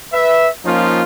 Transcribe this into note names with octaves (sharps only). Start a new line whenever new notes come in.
B4 E5
F3 A#3 C#4 D#4 F4